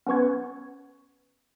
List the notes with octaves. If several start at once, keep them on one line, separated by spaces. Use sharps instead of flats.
B3 C#4 B4 C#6 G#6